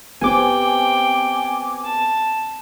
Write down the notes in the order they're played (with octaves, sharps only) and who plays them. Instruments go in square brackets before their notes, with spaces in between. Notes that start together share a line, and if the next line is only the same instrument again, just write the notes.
[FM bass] F1 [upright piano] B3 G4 C5 [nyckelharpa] C4 G5 [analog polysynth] G#5 D6
[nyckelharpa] A5